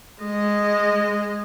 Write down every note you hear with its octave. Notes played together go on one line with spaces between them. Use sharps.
G#3 D#5